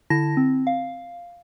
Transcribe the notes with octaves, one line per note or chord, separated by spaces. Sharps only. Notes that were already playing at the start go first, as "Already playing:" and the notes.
D3 E4 A5 A#6
C4
F5